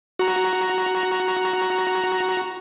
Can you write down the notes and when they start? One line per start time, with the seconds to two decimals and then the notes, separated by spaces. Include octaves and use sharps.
0.19 F#4 A#5